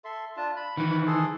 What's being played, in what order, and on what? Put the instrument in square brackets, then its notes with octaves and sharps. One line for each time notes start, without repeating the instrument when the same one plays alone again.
[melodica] A4 E5 C6
D4 F4 A5
B5
[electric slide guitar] D#3 E3 [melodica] F#5 B5
[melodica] G#4 A4 C6